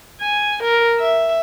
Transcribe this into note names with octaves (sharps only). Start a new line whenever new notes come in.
G#5
A#4
E5